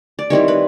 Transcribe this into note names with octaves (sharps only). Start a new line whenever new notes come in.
D5
D#3 G3 C4 E4 C#5
B4